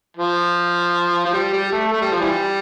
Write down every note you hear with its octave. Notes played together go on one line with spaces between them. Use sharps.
F3
F3
G3
G3
A3
A3
G3
F3
E3 G3